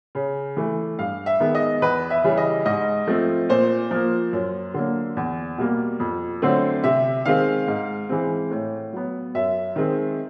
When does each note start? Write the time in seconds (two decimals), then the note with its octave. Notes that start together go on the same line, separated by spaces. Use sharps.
0.15 C#3
0.57 E3 A3
0.99 G2 F5
1.26 E5
1.40 D#3 G#3 B3
1.55 D#5
1.82 E2 B4
2.10 E5
2.24 C#3 E3 G3
2.37 D#5
2.65 G#2 D#5
3.07 F3 A3 C4
3.49 A#2 C5
3.91 F3 A#3
4.33 F#2
4.74 D3 F#3 A#3
5.17 E2
5.58 B2 G3 A#3
6.00 F2
6.42 D3 F#3 A3 C4
6.84 C3 E5
7.25 D#3 G#3 C4 F5
7.67 G#2
8.09 E3 G#3 C4
8.51 A2
8.93 F#3 B3
9.35 F#2 E5
9.76 D#3 G#3 C4